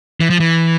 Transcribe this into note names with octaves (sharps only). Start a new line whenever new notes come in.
E3
F3
E3